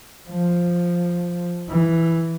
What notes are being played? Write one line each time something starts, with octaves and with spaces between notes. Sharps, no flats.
F3
E3